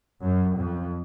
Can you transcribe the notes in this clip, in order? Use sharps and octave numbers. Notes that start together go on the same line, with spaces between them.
F#2
F2